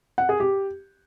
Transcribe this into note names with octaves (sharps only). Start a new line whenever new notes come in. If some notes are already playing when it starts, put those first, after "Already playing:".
F#5
G#4
G4